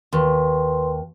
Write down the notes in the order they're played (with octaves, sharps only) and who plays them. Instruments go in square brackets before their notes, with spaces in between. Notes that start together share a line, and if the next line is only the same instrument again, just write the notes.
[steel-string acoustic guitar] D#2 [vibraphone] B4 C6